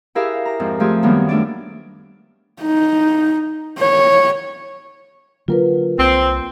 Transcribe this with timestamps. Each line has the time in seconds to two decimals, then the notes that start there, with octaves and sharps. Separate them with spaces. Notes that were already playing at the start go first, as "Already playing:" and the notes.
0.15 E4 G4 G#4 A#4 E5 F5
0.45 A#5
0.60 F2 G#2 C4
0.80 F3 A3 F4 G4 G#4
1.03 F#2 D#3 G3 A#3 B3
1.29 A3 D4 D5
2.62 D#4
3.79 C#5
5.48 D3 F#3 A#3 F4 A#4 B4
5.98 C2 A#3 C4